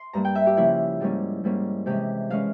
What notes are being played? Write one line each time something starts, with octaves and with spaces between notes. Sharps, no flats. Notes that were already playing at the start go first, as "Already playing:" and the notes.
Already playing: C6
G2 G3 A#3 A#5
G5
E5
G4
C#3 F3 A#3 C#4 E4
G#2 G3 A#3 C#4
G#2 G3 A#3 C#4
C3 E3 G#3 C#4 G4
E3 G#3 C#4 F5